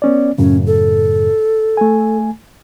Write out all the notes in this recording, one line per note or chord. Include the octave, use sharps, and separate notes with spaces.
B3 C#4 D5
F#2 A2 C#3 C#4
A4
A3 G#5